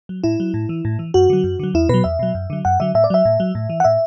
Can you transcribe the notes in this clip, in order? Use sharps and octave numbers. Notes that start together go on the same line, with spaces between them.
F#3
A2 E4
F#3
A2
E3
A2
E3
F#2 F#4
D3 F#3
F#2
D3 F#3
E2 E4
B2 F#3 B4
E2 E5
B2 F#3
F#2
D3 F#3
F#2 F#5
D3 F#3 E5
A2 E5
D5
F#3 E5
A2
F#3
A2
E3
F#5
A2 E5